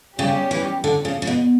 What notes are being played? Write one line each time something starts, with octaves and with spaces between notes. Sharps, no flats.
C#3 G3 C#4 G4
E3
D3
C#3
C#3
B2